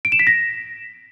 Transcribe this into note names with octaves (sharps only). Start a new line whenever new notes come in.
D7
E7
B6
A#6